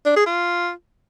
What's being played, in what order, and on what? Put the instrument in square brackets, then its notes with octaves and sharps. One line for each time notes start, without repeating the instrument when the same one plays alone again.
[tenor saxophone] D4
G#4
F4